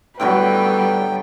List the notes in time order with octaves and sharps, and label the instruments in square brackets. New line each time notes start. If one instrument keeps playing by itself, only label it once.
[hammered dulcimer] A2 D3 F#3 [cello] G3 B3 [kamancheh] B4 [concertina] G5